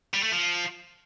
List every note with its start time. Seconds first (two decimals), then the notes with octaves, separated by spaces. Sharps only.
0.14 G3
0.23 A3
0.32 F3